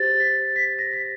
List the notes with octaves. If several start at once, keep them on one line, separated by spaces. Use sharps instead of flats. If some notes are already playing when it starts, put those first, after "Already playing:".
Already playing: G4 C5 A6
B6
B6
A#6
B6